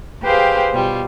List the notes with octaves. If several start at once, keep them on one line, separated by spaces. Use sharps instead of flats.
G4 G#4 B4 C5 F5 G5
B2 G3 F4